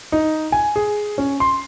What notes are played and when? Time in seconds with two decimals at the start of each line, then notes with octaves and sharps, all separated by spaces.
0.12 D#4
0.52 G#5
0.76 G#4
1.18 C#4
1.40 C6